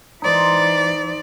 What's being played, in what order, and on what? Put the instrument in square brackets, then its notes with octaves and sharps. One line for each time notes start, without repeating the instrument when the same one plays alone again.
[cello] E3 D5 [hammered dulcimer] D#4 C5